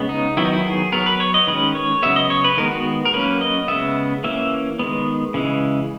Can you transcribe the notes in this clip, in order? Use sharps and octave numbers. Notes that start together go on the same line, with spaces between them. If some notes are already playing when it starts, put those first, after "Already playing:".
Already playing: C#3 G#3 B3
D#4
D#3 F#3 B3 E4
D#4
E4
G#4
F#3 B3 A#4
B4
C#5
D#5
D#3 G#3 C#4 B4
C#5
C#3 F#3 B3 E5
D#5
C#5
B4
D#3 G#3 B3 A#4
F#4
A#4
F#3 A#3 C#4 B4
D#5
C#3 G#3 B3 E5
E3 A#3 C#4 E5
D#3 G#3 B3
C#3 E3 G#3